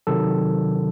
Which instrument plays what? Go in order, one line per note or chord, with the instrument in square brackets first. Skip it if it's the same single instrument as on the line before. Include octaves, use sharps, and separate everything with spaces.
[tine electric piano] C3 D#3 F#3 A4